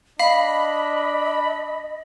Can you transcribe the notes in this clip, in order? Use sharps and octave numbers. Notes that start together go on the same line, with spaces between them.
D4 D#5 F5 B5